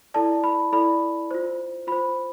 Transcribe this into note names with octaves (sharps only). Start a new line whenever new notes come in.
E4 A4 D5 A5
B5
E4 A4 D5 B5
F4 C5
F4 C5 B5